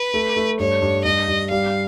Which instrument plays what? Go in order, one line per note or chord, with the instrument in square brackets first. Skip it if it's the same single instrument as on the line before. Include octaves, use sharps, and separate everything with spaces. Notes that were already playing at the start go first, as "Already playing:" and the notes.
Already playing: [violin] B4
[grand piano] A3
A3
[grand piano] G2 [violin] C#5
[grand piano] G2
[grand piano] G2 [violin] D#5
[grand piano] G2
[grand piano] G3 [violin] F5